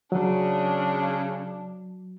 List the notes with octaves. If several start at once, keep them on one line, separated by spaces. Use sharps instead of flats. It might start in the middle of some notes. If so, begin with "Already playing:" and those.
C#3 F#3 D4